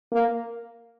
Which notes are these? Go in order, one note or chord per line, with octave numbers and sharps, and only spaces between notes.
A#3